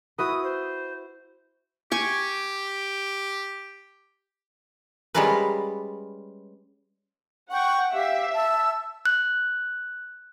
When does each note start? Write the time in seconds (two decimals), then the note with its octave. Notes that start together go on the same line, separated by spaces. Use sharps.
0.19 E4 F#4 B4 D#6
0.43 C5
1.92 G4 G#5 C#6
5.15 G3 G#3 C#4 F4 A#4 B4
7.51 F#5 G5 C#6
7.94 G4 E5 F5
8.35 A5 E6
9.06 F#6